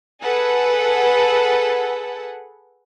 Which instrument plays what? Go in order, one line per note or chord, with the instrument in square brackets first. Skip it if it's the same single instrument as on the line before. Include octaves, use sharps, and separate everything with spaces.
[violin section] G#4 A4 B4 F#5